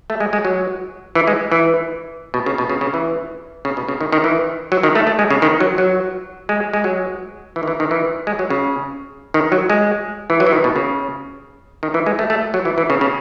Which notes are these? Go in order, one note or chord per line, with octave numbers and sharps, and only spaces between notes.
A3
G#3
G#3
F#3
E3
G#3
E3
B2
C#3
B2
C#3
C#3
E3
C#3
B2
C#3
D#3
D#3
E3
F#3
D#3
A3
A3
G#3
C#3
D#3
F#3
F#3
G#3
G#3
F#3
E3
D#3
E3
D#3
E3
G#3
F#3
C#3
D#3
F#3
G#3
E3
F#3
E3
D#3
B2
C#3
D#3
E3
G#3
A3
A3
F#3
E3
E3
C#3
C#3